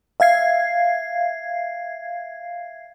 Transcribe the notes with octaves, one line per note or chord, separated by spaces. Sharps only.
E5 F5 G#6 C7